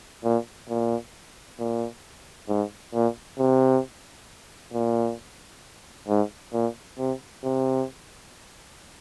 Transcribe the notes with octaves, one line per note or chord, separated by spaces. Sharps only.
A#2
A#2
A#2
G#2
A#2
C3
A#2
G#2
A#2
C3
C3